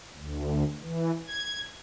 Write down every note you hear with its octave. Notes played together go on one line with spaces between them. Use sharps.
D2
E3
G#6